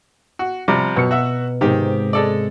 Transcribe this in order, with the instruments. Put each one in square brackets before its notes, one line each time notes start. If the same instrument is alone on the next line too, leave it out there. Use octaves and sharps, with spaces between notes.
[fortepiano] F#4
[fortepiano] C3 F3 G3 [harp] A#5
[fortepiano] F#2 [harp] B2 F6 C#7
[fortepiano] F#4 E5
[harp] G#2 C3 [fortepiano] D#3 G4
[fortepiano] G#3 A4 D5